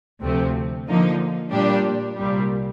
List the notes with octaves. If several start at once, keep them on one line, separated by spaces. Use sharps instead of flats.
D2 C3 F3 A3 C4
D3 F3 A#3 D#4
A#2 G3 D4 G4
C2 A#2 G3